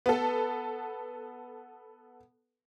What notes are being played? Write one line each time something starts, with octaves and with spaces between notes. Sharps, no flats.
B3 A4